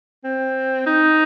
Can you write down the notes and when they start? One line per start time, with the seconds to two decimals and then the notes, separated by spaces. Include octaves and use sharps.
0.24 C4
0.87 D#4